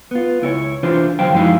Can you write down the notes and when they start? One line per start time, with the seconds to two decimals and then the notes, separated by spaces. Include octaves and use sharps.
0.11 B3 F4
0.42 C#2 E4 F#4 C#5
0.83 C2 E3 D4 F4 C5
1.19 E2 D3 F#3 C5 F5 G5
1.32 F#2 F3 G#3 D#4 E4 F5